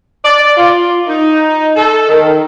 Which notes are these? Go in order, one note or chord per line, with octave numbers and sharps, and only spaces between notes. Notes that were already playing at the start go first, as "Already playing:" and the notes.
D5
F4
D#4
A4
D#3